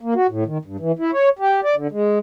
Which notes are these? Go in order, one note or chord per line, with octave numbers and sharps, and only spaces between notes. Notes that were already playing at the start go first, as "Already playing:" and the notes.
A#3
F#4
A2
D#3
G2
E3
E4
C#5
G4
D5
D3
G#3